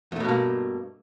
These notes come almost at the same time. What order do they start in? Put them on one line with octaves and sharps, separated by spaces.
E2 A3 B2 G2 A#3